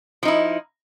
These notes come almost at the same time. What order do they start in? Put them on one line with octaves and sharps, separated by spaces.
F3 D#4 E4